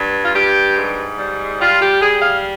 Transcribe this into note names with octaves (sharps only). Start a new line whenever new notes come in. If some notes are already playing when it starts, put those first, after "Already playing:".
Already playing: G2
F4
G2 G4
G#2
G3
G3 F4
G4
G3 G#4
F5